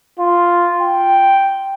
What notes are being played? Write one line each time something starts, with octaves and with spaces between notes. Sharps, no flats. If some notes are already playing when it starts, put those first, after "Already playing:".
F4
G5